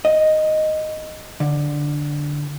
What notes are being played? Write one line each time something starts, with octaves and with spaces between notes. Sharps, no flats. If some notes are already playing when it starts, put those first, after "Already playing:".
D#5
D3